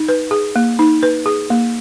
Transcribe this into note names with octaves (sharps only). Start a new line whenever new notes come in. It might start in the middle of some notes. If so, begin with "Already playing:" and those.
Already playing: D#4
B4
G#4
A#3
D#4
B4
G#4
A#3